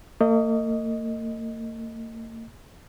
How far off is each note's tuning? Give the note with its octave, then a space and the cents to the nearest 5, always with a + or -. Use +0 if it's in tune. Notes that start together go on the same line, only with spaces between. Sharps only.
A#3 -45 D#5 +0